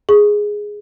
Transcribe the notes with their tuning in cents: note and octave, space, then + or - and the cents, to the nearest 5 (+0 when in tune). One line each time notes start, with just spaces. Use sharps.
G#4 +0 C#6 +0